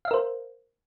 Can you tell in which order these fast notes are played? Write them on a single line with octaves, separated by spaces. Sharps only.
F5 E5 A#4 C5